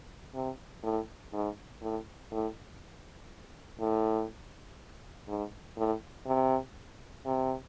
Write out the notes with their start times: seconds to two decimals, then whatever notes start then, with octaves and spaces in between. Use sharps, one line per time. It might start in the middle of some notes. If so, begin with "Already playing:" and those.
0.35 C3
0.84 A2
1.33 G#2
1.82 A2
2.31 A2
3.80 A2
5.28 G#2
5.77 A2
6.27 C3
7.25 C3